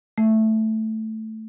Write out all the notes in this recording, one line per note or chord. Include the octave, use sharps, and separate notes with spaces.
A3